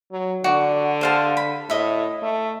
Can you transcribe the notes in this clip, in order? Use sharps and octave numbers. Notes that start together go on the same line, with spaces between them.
F#3
D3 F#4 D5
C5 F5 A5
B5
A2 D#5 E5
A3